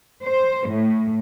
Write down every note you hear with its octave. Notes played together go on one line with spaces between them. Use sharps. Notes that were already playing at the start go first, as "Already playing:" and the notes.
C5
A2